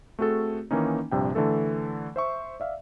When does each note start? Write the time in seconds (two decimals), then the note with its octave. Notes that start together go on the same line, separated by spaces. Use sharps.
0.19 A3 C4 F#4 G#4 A4
0.71 D#3 E3 A#3 C#4 D#4
1.11 A#1 G2 C3 G5
1.35 D3 E3 A3 A4
2.16 C5 E5 C#6
2.60 D5 E5 F5